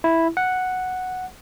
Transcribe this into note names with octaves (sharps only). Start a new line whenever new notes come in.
E4
F#5